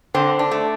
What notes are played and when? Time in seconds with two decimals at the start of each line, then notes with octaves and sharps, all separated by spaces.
0.14 D3 C4
0.39 D4
0.51 A3